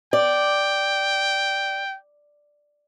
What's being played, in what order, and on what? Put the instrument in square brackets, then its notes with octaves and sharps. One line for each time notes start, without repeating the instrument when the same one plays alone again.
[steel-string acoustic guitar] D5 [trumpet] G5